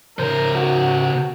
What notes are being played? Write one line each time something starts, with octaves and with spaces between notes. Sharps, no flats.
C#3 A#4 C5
F#4